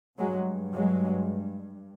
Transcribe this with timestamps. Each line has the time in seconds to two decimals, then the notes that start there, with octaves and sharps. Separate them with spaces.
0.18 G2 F#3 G#3
0.72 F#3 G#3